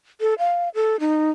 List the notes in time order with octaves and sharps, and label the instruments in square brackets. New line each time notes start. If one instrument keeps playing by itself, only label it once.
[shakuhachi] A4
F5
A4
D#4